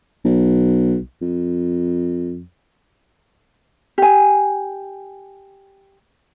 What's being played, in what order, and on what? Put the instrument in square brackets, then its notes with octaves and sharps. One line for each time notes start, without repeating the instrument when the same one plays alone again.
[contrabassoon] B1
F2
[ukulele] G4 G#5